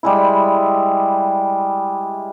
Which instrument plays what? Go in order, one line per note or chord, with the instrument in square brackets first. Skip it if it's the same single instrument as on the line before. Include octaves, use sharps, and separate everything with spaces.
[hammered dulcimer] G3 G#3 E4